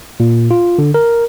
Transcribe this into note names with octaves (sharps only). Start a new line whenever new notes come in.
A#2
F4
D3
A#4